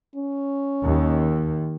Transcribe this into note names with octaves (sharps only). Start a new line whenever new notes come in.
C#4
D#2